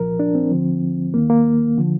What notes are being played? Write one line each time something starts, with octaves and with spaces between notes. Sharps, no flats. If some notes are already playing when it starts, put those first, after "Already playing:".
Already playing: C2 A#2 F3 A#4
D4
C4
D2 D3 F3
D#2 D#3 A#3
A#3
D3 F3